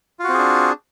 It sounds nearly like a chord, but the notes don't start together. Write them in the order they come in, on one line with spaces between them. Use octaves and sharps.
F4 F#4 C4 G#4 D4